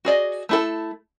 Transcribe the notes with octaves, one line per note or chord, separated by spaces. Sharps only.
F#4 G#4 D5 D#5
A3 E4 A4